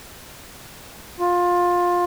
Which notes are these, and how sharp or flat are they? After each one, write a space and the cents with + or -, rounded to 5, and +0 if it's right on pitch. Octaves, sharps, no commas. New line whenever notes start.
F4 +20